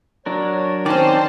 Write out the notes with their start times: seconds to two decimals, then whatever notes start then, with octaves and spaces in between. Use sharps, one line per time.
0.26 F#3 D4 A#4 C#5
0.86 D#3 C4 C#4 C5 D5 G5 A5